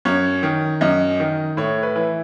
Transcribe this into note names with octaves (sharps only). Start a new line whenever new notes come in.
F#2 C#5
D#3
F#2 D#5
D#3
A2 C#5
B4
E3